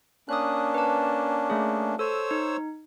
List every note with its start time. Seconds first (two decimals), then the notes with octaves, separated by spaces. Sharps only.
0.29 A#3 C#4 D4 D#6 F#6
0.74 B4 A5
1.50 A3 G#4
1.99 A4 C5 C#5 E6
2.31 D#4